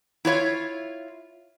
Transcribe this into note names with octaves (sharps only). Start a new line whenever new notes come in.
E4 F4 C#5 E5